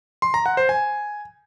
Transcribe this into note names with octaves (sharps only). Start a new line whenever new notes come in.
C6
A#5
F#5
C5
G#5